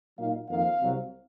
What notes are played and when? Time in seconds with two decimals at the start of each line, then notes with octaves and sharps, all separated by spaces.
0.18 A#2 F#3 A#3 D#4 F5
0.49 F2 D#3 A#3 F5
0.80 C2 C3 F#3 C4